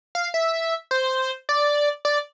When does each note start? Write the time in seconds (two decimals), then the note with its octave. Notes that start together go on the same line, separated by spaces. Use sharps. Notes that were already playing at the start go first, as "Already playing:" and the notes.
0.15 F5
0.34 E5
0.91 C5
1.49 D5
2.05 D5